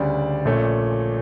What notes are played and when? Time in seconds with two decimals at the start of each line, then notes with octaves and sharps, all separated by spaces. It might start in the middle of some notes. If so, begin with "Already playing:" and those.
Already playing: D2 C#3 G3 D4 D5
0.45 A#1 A#2 A3 C#4